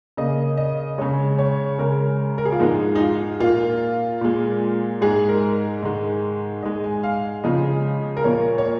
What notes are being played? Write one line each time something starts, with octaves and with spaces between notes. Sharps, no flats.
C#3 A#3 D#5
D#5
C#3 G#3 C#5
C#5
C#3 G#3 A#4
A#4
G#4
F4
G#2 F3 G#3 D#4
D#4
F4
A#2 A#3 F4
A#2 G#3
G#2 G#3 G#4
A#4
G#2 D#3 G#3
G#2 G#3 D#5
G#5
F5
C#3 F3 G#3 D#5
A#4
A#2 F3 A#3 C#5
C#5